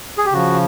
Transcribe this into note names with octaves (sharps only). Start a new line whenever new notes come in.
G#4
G4
C#3 F3 F#4